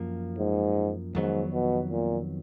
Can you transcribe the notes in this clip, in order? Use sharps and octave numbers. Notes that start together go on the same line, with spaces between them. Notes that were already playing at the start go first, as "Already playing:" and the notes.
Already playing: F#2 F3 A#3
G#2
F2 G#2 D#3 F#3 B3
B2
A#2